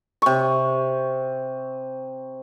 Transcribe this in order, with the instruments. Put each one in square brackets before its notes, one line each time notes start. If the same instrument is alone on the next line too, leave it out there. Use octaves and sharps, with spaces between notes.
[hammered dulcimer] C3 C#6